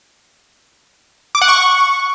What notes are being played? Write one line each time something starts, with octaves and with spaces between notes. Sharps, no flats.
D6
F#5
C#6